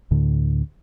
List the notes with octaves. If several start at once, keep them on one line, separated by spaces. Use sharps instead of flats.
D2 A2 D3